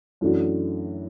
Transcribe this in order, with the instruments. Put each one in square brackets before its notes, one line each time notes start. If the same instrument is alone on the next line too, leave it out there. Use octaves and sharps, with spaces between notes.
[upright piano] F#2 E3 A3 D4 F#4